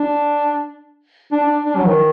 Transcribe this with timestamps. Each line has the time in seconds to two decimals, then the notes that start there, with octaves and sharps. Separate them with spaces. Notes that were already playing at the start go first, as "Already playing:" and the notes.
Already playing: D4
1.32 D4
1.43 D4
1.65 D4
1.77 F#3
1.87 D#3